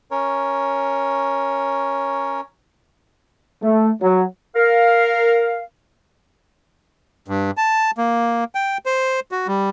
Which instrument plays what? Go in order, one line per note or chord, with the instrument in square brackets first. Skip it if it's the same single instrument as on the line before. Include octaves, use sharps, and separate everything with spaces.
[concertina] C#4 A#4 C#5
[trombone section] A3
F#3
[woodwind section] A#4 F5
[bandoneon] G2
A5
A#3
G5
C5
F#4
G3